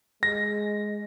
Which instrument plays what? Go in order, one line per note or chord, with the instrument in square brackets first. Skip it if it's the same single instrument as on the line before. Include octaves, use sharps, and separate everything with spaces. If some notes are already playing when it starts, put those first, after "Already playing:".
[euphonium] G#3 [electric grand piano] A#6